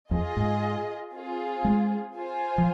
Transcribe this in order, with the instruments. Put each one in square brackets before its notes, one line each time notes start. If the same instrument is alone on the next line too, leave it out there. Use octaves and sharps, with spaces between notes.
[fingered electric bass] F2 [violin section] F4 G#4 D#5
[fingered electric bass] G#2
[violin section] C4 F4 G#4
[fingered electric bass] G#3
[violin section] F4 C5 G#5
[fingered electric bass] F3